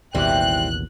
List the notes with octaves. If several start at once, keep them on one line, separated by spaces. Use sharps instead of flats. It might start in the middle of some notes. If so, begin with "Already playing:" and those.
A1 D#2 B2 E3 G3 C4 G5 F#6